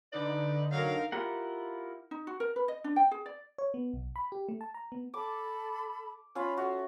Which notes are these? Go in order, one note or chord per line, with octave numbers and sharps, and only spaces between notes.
D3 D#4 B4 D5
F#3 A#4 F5
E4 F4 G4 A#4 F#5
D#4
F#4
A#4
B4
D#5
D4
G5
G#4
D5
C#5
B3
B1
B5
G4
A3
A5
A#5
B3
A4 A5 B5 D6
C#4 F4 F5 B5
F#4 A4 E5